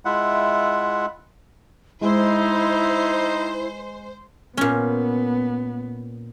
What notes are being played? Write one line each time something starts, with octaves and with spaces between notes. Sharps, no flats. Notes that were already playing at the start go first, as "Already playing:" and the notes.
G#3 E4 F4 E5 F#5
G#3 D#4 E4 C5
A#2 B3 C#4